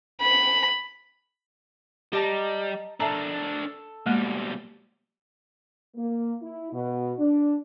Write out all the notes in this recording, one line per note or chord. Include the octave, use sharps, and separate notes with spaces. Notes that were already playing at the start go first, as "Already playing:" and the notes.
B5
G3 G4 D#5 A5 A#5
D4 A4 A#4 E5 A5 A#5
B2 G3 G#3 A#3
A#3
E4
B2
D4